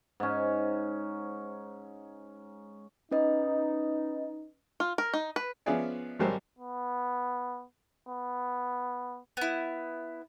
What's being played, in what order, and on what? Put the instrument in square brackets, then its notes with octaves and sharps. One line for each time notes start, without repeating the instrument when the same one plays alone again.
[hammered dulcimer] G#2 C#4
[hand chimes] C#4 B4 D#5 [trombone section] D#4
[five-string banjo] F4
A#4
D#4
B4
[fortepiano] F3 B3 C#4 G#4 D5 E5
G#1 F#3 G3 A#4 C5
[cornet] B3
B3
[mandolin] B3 E4